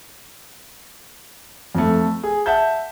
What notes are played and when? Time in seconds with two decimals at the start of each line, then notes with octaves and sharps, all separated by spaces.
1.75 F2 A3
2.23 G#4
2.46 E5 F#5 A5 G6